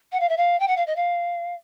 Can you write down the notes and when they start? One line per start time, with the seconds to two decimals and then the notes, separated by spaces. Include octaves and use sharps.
0.12 F#5
0.20 F5
0.29 E5
0.37 F5
0.60 G5
0.67 F#5
0.77 F5
0.87 D#5
0.96 F5